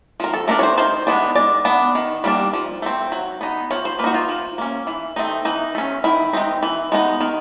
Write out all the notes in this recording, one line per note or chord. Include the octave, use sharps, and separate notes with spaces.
F3 A#4
A4
A3 D4 A#4
C#5
C5
D#3 C5
G#3 B3 D4
G#3 D5
B3 D4
D#3
G3 A#3 D4
F3
A3 C4
F#3
B3 D#4
F3 C#5
C5
A#3 B4
D#4 F#4
F4
F3
A#3 C#4
E3
A3 C4 D#4
E3 D#4
A3 C#4
D#3 E4
G#3 C4 D#4
E3
G#3 B3 D#4
D#3